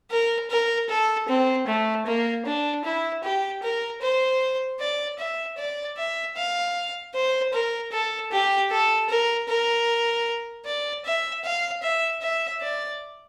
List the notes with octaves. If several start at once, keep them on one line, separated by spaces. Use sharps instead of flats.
A#4
A#4
A4
C4
A3
A#3
D4
E4
G4
A#4
C5
D5
E5
D5
E5
F5
C5
A#4
A4
G4
A4
A#4
A#4
D5
E5
F5
E5
E5
D5